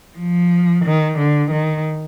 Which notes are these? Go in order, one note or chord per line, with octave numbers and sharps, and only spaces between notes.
F3
D#3
D3
D#3